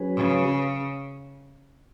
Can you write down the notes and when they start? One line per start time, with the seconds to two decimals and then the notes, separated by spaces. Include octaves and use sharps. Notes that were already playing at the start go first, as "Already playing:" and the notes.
Already playing: F#3 C#4 G#4 B4
0.16 C#3